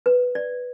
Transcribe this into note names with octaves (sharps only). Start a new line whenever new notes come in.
B4
D5